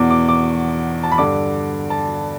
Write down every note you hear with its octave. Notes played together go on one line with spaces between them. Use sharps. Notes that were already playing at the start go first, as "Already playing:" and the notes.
Already playing: E2 B2 D6
D6
D6
A5
B5
G2 D3 D6
A5